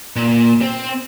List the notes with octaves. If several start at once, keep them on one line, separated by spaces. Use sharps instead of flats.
A#2
C4